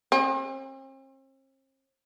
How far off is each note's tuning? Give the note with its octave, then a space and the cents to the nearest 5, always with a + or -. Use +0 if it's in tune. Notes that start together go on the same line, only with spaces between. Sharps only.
C4 +45